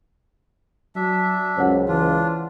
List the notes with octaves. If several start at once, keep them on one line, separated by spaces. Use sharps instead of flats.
F#3 D4 E5
C#2 F#2 C5 C#5 F#5
E3 D4 F4